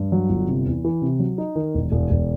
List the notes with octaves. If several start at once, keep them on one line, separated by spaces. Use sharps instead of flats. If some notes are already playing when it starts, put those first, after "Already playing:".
Already playing: G2
F#3
G1
C3
E2
E3
C3
F#3
D#4
D#3
E1
E1
E1